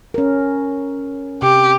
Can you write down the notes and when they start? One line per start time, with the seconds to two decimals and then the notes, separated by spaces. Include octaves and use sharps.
0.14 C#4 A#4
1.42 C3 G4